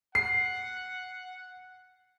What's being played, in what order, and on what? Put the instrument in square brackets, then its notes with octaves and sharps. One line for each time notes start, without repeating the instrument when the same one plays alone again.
[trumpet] F#5 [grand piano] C7